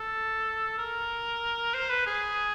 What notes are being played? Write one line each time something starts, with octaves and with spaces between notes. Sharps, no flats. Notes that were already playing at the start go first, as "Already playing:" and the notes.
Already playing: A4
A#4
C5
B4
G#4